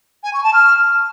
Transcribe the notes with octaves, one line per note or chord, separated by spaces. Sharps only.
G#5
C#6
A5
F6